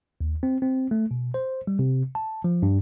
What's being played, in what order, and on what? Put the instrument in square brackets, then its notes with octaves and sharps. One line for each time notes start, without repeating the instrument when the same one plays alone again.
[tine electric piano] D#2
C4
C4
A3
B2
C5
G3
C3
A5
F3
G2